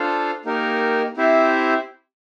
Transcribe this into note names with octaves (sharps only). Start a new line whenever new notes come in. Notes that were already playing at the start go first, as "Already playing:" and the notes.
Already playing: D4 F4 A4 C5 F5
A#3 D#4 G4 A#4
C4 E4 G4 C5 E5